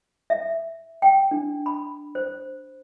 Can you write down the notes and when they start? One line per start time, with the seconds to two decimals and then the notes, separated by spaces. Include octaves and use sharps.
0.30 E5
1.02 G5
1.31 D4
1.66 B5
2.15 C5